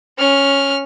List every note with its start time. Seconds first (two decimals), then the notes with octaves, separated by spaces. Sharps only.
0.18 C#4 F6